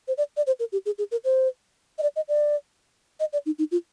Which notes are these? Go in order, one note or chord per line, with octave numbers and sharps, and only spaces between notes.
C5
D5
D5
C5
A#4
G4
G#4
G#4
A#4
C5
D#5
D5
D#5
D5
D#5
D5
D#4
D#4
F4